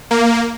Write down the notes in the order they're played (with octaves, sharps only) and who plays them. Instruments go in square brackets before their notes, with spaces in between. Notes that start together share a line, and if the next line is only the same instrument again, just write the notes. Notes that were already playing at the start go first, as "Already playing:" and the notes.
[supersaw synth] A#3